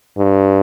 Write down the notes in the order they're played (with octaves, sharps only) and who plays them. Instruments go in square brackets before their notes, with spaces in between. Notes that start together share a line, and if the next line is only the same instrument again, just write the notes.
[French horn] G2